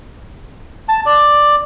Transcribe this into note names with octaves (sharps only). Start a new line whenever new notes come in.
A5
D5